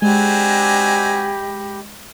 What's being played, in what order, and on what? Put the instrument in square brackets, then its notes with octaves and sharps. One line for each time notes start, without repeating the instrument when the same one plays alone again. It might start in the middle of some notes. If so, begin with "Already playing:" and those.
[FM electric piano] G#3 [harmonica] C4 D4 F#4 [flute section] G4 D#5 B5 [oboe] G#5